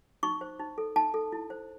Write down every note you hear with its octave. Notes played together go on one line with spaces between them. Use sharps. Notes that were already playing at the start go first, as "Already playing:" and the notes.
D#4 C#6
C5
D#4
A4
D#4 A5
A4
E4
C5